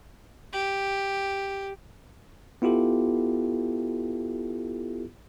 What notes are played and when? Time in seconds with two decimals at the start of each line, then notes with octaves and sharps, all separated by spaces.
0.53 G4
2.62 B3 E4 F4 G4 A4